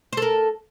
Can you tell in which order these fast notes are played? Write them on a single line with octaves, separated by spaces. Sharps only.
C5 A4 A#4